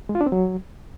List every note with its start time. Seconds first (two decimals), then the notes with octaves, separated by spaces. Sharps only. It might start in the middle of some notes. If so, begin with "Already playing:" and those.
0.09 G#3
0.15 F4
0.21 D4
0.26 C4
0.32 F#3